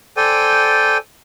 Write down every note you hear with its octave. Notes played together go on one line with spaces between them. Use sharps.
A4 C5 D5 G5 G#5